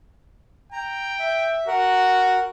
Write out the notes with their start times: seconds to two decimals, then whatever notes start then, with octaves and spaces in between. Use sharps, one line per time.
0.72 G5 A#5
1.19 E5
1.67 F#4 A#4 F#5